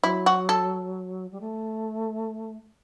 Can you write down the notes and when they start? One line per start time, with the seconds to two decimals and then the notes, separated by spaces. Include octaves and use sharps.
0.03 F#3 E4
0.26 F#4
0.49 A4
1.32 G3
1.41 A3